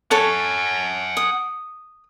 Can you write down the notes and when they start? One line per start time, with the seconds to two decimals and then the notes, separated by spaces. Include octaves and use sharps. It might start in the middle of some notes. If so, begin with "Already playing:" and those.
0.11 A4 C#5 F#5 G#5 A5
1.17 D#6